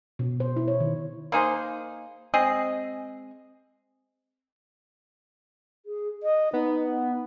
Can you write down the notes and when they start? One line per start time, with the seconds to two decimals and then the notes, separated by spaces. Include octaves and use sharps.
0.19 B2
0.40 C5
0.56 E4
0.68 C#5
0.80 D#3
1.32 A#3 D#4 G#4 C5
2.34 G#3 C4 G#4 D#5
5.86 G#4
6.23 D#5
6.53 B3 D#4